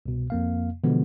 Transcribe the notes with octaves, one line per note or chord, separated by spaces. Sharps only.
C2 B2
F2 A#3 F5
B2 D3 E3 F3 G#3 B3